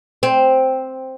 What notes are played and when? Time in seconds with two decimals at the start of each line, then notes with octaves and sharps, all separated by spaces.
0.23 C4